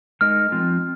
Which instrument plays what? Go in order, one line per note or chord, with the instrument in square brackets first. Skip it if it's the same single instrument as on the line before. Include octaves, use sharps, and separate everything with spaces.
[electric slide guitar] G#3 D#4 A#4 D#5 [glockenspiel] F6
[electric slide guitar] F3 C4 F4